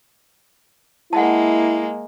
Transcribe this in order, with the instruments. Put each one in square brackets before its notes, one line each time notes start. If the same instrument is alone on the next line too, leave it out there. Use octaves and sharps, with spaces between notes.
[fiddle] G#3 A#3 [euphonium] E4 [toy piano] F#5 A5